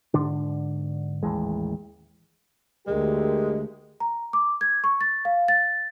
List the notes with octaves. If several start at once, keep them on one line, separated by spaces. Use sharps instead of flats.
G#2 D3 D4
A1 D#2 E3 G#3
D2 G#3 G4 A#4
A#5
D6
G#6
C#6
A6
F5
A6